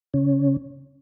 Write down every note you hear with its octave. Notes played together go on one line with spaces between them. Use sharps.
C#3 C#4